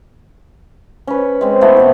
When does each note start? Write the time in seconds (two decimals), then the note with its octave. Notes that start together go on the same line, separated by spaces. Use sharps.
1.07 C#4 B4
1.41 G#3 C4
1.61 A3 B3 C4 E4
1.77 B2 E3